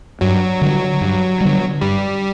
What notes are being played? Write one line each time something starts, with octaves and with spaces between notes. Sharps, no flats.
G2 F#3
D3 G3
G2
D3 G3
G2 G3